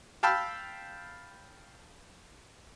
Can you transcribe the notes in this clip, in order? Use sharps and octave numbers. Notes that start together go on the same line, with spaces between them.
F5 G5 A5 B5 E6 F6